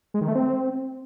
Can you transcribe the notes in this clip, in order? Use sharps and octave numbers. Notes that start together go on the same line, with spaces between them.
G#3
D#3
A3
C4